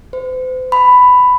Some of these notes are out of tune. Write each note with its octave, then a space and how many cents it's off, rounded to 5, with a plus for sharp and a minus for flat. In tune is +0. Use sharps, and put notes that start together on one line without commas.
C5 -40
B5 +10